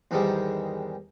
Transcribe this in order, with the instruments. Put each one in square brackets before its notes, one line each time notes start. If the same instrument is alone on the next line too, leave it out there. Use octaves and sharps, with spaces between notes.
[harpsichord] E2 G#2 D#3 G3 G#3